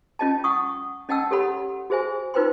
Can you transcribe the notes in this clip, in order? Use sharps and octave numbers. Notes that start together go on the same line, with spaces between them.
C#4 F4 D#5 G5 A5
F#5 G5 C#6 D#6
C#4 D#5 F#5 G5 A5 E6
G4 A4 C#5 F#5 B5
F#4 G#4 C5 E5 G#5
D#4 F4 B4 C5 G5 C6